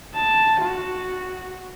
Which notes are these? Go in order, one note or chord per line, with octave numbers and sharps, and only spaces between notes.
A5
F#4